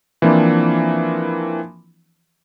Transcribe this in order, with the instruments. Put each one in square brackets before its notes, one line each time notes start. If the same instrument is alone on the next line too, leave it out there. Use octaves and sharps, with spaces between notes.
[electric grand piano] E3 F3 A#3 C4 D4 E4